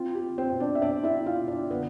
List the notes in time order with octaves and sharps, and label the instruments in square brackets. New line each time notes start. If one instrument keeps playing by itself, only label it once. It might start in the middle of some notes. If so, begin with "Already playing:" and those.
Already playing: [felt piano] C4 F4
G4
C4
C4 C5
B2
D4 D5
E5
B2 D4 D5
E4 E5
C4
F4 F5
B2
D4 D5
D3 B3 B4